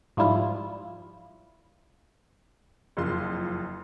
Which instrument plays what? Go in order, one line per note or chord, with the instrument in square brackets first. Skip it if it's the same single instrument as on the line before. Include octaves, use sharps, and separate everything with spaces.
[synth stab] G#2 F3 G3 E4 F4
[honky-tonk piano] F#1 F2 F4 C6